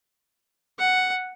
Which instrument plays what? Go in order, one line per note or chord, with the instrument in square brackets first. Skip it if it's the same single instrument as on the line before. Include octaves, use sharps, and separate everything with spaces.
[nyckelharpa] F#5